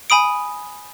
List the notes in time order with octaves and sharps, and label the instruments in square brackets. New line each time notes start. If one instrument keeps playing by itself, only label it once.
[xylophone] G#5 B5 D#6 D7